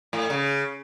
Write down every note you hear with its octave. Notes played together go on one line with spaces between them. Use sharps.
A2
C#3